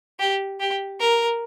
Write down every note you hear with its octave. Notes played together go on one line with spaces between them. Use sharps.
G4
G4
A#4